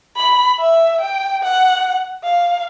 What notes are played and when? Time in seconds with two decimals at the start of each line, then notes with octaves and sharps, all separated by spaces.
0.17 B5
0.59 E5
1.01 G5
1.43 F#5
2.24 F5